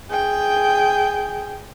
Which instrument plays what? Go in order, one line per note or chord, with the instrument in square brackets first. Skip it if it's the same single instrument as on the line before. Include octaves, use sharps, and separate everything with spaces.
[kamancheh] G#4 G5